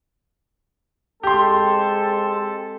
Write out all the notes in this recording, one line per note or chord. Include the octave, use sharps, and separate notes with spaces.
G#3 C4 G4 A4 C6